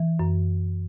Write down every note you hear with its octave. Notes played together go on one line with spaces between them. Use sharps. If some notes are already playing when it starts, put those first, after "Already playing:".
Already playing: E3
F#2